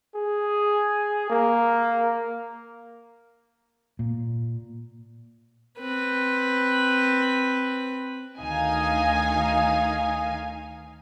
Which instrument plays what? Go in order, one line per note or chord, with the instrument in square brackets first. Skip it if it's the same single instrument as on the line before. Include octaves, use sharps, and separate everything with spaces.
[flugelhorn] G#4
A#3
[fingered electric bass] A#2
[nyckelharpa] C4 B4
[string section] D2 D#3 D#4 F5 G#5